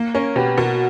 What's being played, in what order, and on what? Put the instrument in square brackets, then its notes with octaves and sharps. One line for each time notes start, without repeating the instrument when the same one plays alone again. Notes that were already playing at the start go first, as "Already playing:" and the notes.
Already playing: [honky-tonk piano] A#3
[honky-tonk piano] C#4 [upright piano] A#4 C#5
[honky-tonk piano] B2 [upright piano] G4 B4
[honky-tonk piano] B2 [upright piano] F#4 A#4